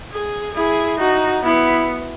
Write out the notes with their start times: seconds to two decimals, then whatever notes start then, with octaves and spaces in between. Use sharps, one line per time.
0.12 G#4
0.55 E4 G#4
0.99 D#4 F#4
1.43 B3 E4